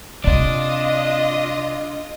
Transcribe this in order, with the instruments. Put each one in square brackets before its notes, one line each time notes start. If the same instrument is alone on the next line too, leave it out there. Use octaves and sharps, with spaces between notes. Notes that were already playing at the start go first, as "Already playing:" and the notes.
[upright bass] C3 C4 [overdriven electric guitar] D4 D5 [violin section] F4 D#5